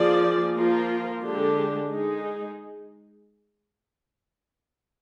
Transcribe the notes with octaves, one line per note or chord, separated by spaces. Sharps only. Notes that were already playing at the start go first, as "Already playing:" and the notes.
Already playing: F3 A#3 F4 G#4 D5
F3 A#3 F4 A#4
D3 G#3 D4 G4
G#3 D#4 G#4